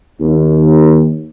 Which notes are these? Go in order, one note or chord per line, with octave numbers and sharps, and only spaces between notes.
D#2